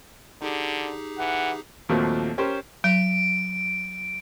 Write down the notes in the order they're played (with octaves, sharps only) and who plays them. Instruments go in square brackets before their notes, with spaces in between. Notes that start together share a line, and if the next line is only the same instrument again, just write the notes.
[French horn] D3 [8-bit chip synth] D#4 G4 G#4
[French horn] E3 [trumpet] F#5
[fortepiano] D#2 A#2 F3 F#3 A3 C4
C#4 G4 A#4 C5
[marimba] F#3 [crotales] D7